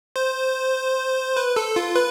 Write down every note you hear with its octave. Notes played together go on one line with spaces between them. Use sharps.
C5
B4
A4
F4
B4